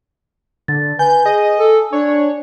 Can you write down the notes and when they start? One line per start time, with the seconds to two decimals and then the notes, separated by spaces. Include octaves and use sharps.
0.68 D3 A6
0.99 B4 G#5 G6
1.26 G#4 D#5
1.58 A4
1.93 D4 C#5